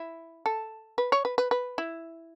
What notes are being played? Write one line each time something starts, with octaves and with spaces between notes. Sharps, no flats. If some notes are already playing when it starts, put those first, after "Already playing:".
Already playing: E4
A4
B4
C#5
B4
B4
B4
E4